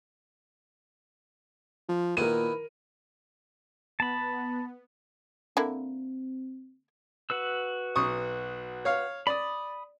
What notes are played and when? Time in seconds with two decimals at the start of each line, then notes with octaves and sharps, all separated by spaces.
1.89 F3
2.17 A#2 D#3 B3 E4 A#4 D#7
4.00 B3 A5 B5
5.57 D3 A#3 C4 E4
7.30 F#4 B4 E6
7.96 B1 C#6 D#6
8.85 C#5 F5
9.27 D5 B5 D#6